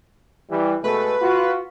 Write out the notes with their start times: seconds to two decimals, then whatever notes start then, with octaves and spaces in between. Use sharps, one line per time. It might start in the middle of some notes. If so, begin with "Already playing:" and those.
0.51 E3 G3
0.84 B2 G#3 A3 B4
1.22 F4 F#4